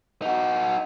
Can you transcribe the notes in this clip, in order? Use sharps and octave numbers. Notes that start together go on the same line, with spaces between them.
D#4 F#4